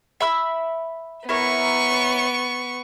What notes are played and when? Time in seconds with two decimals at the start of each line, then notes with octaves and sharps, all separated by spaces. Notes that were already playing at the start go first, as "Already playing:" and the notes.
0.21 E5 B5 E6
1.29 B3 E4 A#4 C#5 C#6